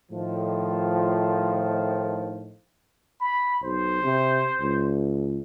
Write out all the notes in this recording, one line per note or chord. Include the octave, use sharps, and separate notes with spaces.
A2 D#3 F3
B5
B1 C5
C3
C#2